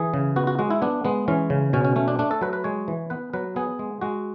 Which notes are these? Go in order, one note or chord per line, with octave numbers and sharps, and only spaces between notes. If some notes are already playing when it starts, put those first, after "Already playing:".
Already playing: E3 G#4
C#3
B3 F#4
F#4
G#3 F#4
E4
B3 D4
G#3 B3
E3 C#4
C#3
B2 C#4
C#4
A3 C#4
D4
A3 D4
A4
F#3 B4
B4
G#3 C#5
E3
B3 B4
F#3 B4
B3 G#4
G#3
G#3 F#4